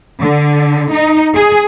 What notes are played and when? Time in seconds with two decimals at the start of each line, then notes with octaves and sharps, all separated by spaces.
0.20 D3
0.91 D#4
1.35 G#4